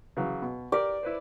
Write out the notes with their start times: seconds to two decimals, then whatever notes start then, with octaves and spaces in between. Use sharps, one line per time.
0.17 C#3 E3 F#3
0.42 B2
0.72 G4 A#4 D5
1.03 E4 B4 C5